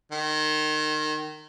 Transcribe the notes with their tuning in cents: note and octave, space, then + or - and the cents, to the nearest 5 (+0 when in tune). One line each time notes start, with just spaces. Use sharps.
D#3 -20